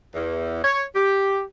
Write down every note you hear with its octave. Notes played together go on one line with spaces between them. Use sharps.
E2
C#5
G4